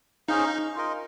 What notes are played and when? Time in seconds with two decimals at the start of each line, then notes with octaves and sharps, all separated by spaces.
0.28 C#4 D#4 G#4 C5 F5
0.76 F4 A#4 D#5